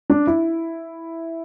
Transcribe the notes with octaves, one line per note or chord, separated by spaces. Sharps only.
D4
E4